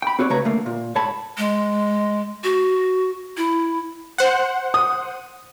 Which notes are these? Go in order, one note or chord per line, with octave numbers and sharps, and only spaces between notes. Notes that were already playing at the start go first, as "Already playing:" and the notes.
G5 B5
C4 F#4 B4 C#5 D5
C#3 A3 F#4 B4 C#5 A#5
D2 A3 A#3
A#2
G#2 C#5 A5 B5
G#3
F#4
E4
C5 F#5
D#6